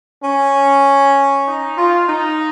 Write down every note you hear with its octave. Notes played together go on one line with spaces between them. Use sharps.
C#4
D#4
F4
D#4